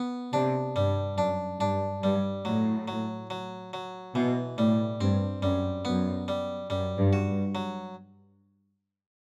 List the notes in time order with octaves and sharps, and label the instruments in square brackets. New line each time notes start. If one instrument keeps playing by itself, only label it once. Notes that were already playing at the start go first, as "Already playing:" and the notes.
Already playing: [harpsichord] B3
[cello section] C3 [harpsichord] D4
[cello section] G2 [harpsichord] G3
[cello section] F#2 [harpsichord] D4
[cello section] G2 [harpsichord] D4
[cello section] G2 [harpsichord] G3
[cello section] A2 [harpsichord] F#3
[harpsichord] F#3
F#3
F#3
[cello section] B2 [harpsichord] E3
[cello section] A2 [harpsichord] G3
[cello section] G2 [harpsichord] C4
[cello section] F#2 [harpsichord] G3
[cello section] F#2 [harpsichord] B3
[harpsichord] G3
[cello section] F#2 [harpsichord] G3
[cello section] G2
[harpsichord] F#4
[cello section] G2
[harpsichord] F#3